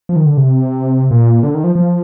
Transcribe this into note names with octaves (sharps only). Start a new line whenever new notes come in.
F3
D#3
D3
C3
A#2
D3
D#3
F3
F3